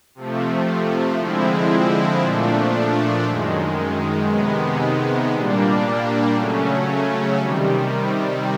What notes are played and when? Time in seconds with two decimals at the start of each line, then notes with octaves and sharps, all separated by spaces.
0.15 C3 F3 A3
1.18 D3 F3 G#3 C4 E4
2.21 A#2 F3 A3 D4
3.25 F#2 D#3 G#3
4.29 C3 D#3 G#3 B3
5.32 A#2 G3 A#3 D4
6.35 C#3 F#3 A3 C#4
7.38 C3 D#3 G3